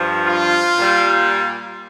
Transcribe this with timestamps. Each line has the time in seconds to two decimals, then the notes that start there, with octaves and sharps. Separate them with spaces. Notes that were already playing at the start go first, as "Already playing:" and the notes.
Already playing: G2 F3
0.26 F4
0.77 A#2 G3